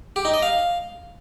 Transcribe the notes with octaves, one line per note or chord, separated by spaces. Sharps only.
G4
D#4
D#5
F5